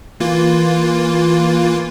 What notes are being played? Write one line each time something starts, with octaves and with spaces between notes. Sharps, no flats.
E3 A#3 F4